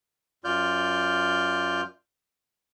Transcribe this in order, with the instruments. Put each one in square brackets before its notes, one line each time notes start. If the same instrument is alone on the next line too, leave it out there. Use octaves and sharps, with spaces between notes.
[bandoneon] F#2 F4 D5 F6 G6